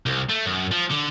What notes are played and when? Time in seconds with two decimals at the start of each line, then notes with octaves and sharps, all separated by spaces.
0.06 C2
0.29 A3
0.46 F#2
0.71 F3
0.90 D3